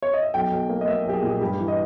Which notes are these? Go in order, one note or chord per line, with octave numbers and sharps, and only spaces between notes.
C#5
D#5
E5
B1 G5
B1
A#3
D#5
A#3 E5
B1 G4
G#4
A#2
G#4
G2 G4
E3
D#5